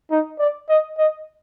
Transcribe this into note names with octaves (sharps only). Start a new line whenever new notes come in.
D#4
D5
D#5
D#5